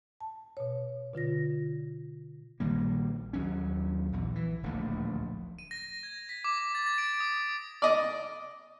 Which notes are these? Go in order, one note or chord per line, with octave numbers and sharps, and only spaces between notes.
A5
B2 C#5
B2 D3 F4 A#6
A#1 D#3 G3 A#3
D#2 F#3 C#4
A#1 E2
E3
D1 A#1 D#2 A3
D#7
A#6
G#6
B6
D6
D6
A6
A6
D7
D#6
D5 D#5